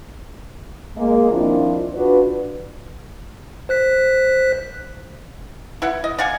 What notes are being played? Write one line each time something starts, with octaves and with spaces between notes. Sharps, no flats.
G#3 A#3
D#3 F3 C4 D4 E4 F4
C#3 D4 F4 F#4 B4
C5 F#6 B6
E4 B4 F#5
D#5
D5 F5 F#5 G#5